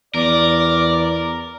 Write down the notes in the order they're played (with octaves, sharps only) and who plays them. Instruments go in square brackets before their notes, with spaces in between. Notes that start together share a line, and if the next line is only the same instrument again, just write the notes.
[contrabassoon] E2 [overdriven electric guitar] A#4 [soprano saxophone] D5